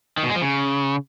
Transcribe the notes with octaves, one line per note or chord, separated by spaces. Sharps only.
D#3
B2
G#3
F3
C#3